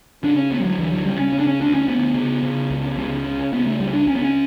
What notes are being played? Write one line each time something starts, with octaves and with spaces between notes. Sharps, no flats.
C#3 D4
C#4
D2 B3
G3
F#3
D2 E3
F#3
C#3 G3
C#4
C#3 C#4
D4
C#4
D2 D4
C#4
D2 B3
C#3
C#3
C#2
C#2
C#3
C#3 B3
A3
C#2 G3
D4
C#2 C#4
B3
C#4